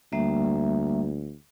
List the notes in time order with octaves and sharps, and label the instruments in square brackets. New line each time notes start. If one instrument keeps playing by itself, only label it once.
[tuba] D2 [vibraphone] G3 A#3 E5